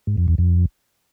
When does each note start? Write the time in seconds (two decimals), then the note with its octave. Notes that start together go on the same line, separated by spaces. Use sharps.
0.07 G#2
0.17 F2
0.28 E2
0.38 F2